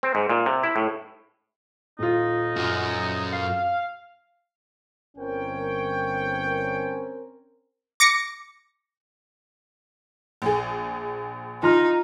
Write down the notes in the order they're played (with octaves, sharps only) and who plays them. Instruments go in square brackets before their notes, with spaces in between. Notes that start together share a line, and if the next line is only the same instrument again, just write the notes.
[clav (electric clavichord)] C4
G#2
A#2
C3
E4
A2
[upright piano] D#1 F4 [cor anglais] D#4
[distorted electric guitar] F#2
[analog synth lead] F5
[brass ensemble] G1 C#5 G5 [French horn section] C4 C#4 A#4
[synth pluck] D6 A#6 C#7
[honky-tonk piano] A#1 G#4
[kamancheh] D#4 [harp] F4 A#5 F6